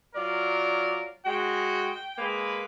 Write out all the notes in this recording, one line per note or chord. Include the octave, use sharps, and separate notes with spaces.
F#3 F4 A#4 D5
G#3 F#4 G5
G#3 A#3 B4